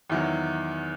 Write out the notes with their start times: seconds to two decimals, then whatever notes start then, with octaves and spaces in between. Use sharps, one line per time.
0.10 E2 D#3 F#3 E4